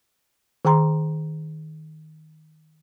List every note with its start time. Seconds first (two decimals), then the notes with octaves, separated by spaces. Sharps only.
0.65 D#3 G#4 G5 A#5 C6